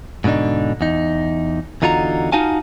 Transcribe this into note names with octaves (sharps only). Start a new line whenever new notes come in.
G#2 B2 D3 D4 D#4
E2 D#4
E2 D3 D#4 F4 F#4 A#5
D#4 F4 F#4 F5 G#5 A5